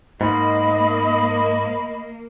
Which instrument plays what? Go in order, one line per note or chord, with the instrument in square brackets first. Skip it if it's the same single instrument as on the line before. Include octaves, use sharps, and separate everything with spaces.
[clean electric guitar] G#2 [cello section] A#3 [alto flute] D#5 [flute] B5